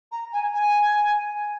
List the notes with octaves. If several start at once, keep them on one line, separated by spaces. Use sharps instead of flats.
A#5
G#5
G#5